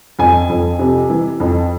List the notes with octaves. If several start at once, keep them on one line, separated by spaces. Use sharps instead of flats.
F2 G#5
F2
C3
E3
F2